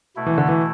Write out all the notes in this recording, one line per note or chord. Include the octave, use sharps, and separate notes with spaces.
B2 A3 E4
E3
D3
E3